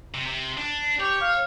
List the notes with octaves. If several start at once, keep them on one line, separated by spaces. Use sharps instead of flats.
C3
C3
D4
G4 C#5
F5